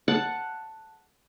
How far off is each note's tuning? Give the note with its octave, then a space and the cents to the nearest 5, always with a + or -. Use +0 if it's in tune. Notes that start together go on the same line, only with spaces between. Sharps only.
F#5 +0 A5 +5